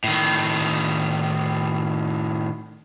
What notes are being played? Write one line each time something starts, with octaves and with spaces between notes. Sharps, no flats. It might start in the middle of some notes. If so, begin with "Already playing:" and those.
A2 D#3